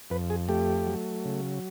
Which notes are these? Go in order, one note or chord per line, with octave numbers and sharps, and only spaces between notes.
F2 B4
G#4
A3 G4
F#3
C#3